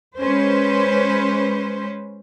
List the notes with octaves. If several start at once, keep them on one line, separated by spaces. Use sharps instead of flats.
G#3 C#4 B4 C5